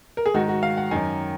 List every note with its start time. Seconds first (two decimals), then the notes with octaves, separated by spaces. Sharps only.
0.17 A#4
0.26 G#4
0.34 G#2 D#3 F#4
0.49 F#4
0.63 F5
0.77 F#5
0.91 F#2 D#3 G#5